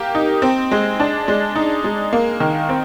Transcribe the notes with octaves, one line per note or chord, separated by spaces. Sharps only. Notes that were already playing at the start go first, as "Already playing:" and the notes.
Already playing: A#3 G4
D#4
C4
G#3
D4
G#3
D#4
G#3
A#3
D#3
C4